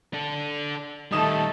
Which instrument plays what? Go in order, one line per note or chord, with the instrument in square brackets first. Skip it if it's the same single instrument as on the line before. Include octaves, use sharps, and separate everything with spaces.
[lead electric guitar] D4 A4
[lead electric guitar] D#3 G3 [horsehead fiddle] A3 A4 [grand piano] D#4 D#6 E7